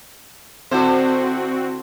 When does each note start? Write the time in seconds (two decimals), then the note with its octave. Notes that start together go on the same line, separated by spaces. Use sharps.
0.71 D3 C4 E4 F#4 C5